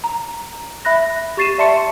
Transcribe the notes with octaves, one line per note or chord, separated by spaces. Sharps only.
A#5
E5 B5 F#6 A#6
G4 C#6 A6 C7 D#7 E7
D5 E5 A5 C6 C#6 C#7